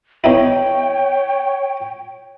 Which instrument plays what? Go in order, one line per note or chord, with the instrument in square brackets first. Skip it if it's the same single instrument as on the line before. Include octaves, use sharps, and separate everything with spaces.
[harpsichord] E2 D#4 E4 [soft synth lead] C#5 [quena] G5